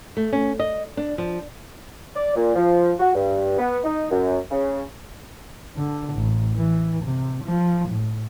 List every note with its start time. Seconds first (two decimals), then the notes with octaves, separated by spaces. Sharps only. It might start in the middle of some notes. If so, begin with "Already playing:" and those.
0.17 A3
0.33 C#4
0.60 D#5
0.97 D4
1.18 F3
2.15 D5
2.36 A#2
2.56 F3
3.00 F#4
3.15 G2
3.58 B3
3.84 D#4
4.10 F#2
4.51 C#3
5.76 D3
6.14 A1
6.56 E3
7.04 C3
7.44 F3
7.89 A2